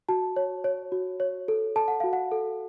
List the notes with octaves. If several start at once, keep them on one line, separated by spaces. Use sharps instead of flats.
F#4 A5
C#5
C#5
F#4
C#5
A4
A4 A5
F#5
F#4 F5
F#5
A4